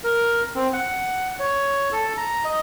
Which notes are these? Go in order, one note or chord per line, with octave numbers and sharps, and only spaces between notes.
A#4
C4
F#5
C#5
A4
A#5
D#5